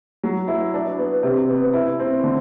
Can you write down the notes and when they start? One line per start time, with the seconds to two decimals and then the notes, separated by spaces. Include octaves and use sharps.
0.23 F#3
0.48 E4
0.74 D4
0.98 B3
1.23 C3
1.48 B3
1.73 E4
1.99 C4
2.24 D3